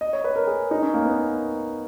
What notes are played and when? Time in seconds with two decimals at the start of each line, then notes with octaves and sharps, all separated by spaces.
0.01 D#5
0.13 C#5
0.24 B4
0.36 A#4
0.47 G#4
0.71 D#4
0.82 C#4
0.94 A#3
1.06 B3